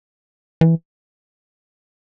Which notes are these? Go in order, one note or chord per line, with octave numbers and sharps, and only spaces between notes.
E3